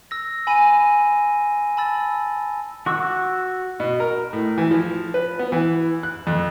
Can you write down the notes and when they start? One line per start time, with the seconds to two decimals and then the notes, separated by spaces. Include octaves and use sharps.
0.11 E6 A#6
0.47 G#5 B5 D#7
1.77 A5 B5 E6 A6
2.86 F#4 C#6 D6 E6
3.80 B2
4.00 A#4
4.33 A2
4.58 E3
4.71 F3
5.14 B4
5.39 B3
5.52 E3
6.03 F#6
6.27 F2